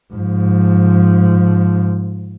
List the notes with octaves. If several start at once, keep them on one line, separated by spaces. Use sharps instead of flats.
G#2 F3